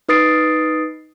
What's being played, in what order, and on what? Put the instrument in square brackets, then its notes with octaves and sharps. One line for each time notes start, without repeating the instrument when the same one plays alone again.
[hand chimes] D#4 B4 D#6 A6 C7 D7